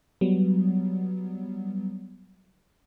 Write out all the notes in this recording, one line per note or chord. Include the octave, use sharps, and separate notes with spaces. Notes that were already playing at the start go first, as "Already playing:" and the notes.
F#3 G3 B3